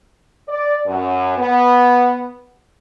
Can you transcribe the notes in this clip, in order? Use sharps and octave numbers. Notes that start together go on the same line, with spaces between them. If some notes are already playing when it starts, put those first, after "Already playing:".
D5
F#2
B3